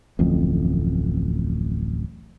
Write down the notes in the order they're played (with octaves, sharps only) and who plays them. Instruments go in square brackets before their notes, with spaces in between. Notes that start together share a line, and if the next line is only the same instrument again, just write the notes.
[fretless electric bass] D1 A1 F2